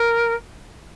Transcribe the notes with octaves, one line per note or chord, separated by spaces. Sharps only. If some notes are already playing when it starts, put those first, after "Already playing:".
Already playing: A#4